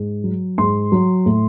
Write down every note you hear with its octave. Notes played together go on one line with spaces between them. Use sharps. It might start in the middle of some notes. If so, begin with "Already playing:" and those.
Already playing: G#2
F#3
G#2 C6
F#3
A2